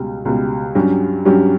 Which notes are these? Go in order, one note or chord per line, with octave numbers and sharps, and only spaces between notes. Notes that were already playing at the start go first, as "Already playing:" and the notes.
Already playing: C#2 B2 G3
C#2 B2 G3
G2 F#3 C#4 G4
G2 F#3 C#4 G4